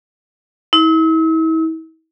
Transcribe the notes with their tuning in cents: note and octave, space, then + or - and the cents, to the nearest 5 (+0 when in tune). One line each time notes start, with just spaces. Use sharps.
E4 -40